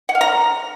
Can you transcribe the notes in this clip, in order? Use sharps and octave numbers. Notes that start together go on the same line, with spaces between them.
F#5
F5
A#5